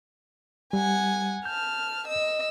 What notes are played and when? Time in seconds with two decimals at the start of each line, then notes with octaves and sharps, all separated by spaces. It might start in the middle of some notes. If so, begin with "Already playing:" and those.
0.73 G3 F#5 G#5
1.45 A5 F6 G6
2.08 D#5 E6